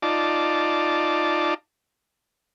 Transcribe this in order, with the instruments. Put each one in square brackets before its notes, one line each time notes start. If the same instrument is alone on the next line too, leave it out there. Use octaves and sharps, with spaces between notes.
[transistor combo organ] D#4 F4 D5 A5 D6